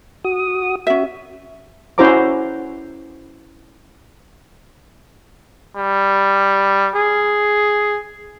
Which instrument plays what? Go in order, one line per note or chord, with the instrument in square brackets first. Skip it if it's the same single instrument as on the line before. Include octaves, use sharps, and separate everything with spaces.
[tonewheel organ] F#4 D#6
[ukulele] C#4 E5 [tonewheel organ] F#4
[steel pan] C#4 E4 F#4 C5 A#5 D6
[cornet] G3
G#4